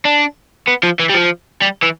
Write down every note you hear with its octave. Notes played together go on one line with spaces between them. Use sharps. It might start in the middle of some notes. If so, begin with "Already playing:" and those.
D4
B3
F3
E3
G3
F3
G3
E3